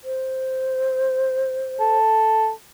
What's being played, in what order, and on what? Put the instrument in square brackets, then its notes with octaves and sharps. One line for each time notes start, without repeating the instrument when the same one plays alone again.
[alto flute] C5
[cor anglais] A4